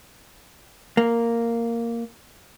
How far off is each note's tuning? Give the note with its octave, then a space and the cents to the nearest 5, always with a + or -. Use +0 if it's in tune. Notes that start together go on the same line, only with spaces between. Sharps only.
A#3 -5